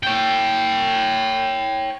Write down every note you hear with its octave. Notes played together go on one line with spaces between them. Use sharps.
C#5 G5